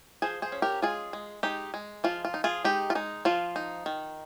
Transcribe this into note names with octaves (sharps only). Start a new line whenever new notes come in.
F3 G#4 C5
G#4 C5
C#4
G4 A#4
G#3 F4 G#4
G#3
G#3 D#4 G4
G#3
F3 F4
F4
D#4
F4 G#4
G#3 D#4 G4
F4
G#3 D#4
F3 F4
D#4
D#3